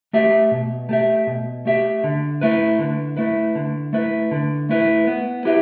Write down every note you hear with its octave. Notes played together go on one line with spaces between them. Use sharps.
A3 G4 E5
B2
A3 G4 E5
B2
A3 G4 E5
D3
A3 E4 B4
D3
A3 E4 B4
D3
A3 E4 B4
D3
A3 E4 B4
B3
E4 G4 B4 E5